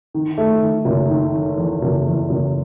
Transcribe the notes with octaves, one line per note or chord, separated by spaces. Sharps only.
D#3
A3
D#3
F#1
D#3
D#3
E2
F#1
E2
F#1